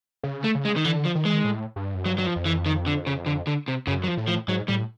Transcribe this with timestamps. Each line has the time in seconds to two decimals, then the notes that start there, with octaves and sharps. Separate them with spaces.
0.23 C#3
0.44 A3
0.55 C#3
0.65 G#3
0.76 D#3
0.84 D3 E3
1.05 F3
1.15 D#3
1.24 E3 G#3
1.33 D#3
1.44 A2
1.76 G2
1.94 F#2
2.06 G2 F#3
2.18 F#3
2.26 F3
2.36 F2
2.46 E3
2.66 D#3
2.86 D3
3.07 C#3
3.26 D3
3.47 D3
3.68 C3
3.87 F#2 C#3
4.04 F#3
4.08 F3
4.17 A2
4.28 F3
4.48 G#2 F#3
4.68 A2 G3